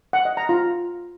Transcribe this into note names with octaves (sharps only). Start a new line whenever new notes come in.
F#5
D#5
A#5
F4